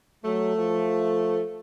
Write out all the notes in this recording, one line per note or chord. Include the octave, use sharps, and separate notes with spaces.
F#3 A3
F3